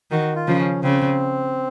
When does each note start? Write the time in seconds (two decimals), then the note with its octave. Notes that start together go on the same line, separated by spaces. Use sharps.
0.11 D#3 F#4
0.35 F4
0.48 C#3 F3
0.59 C#4
0.84 C#3 C4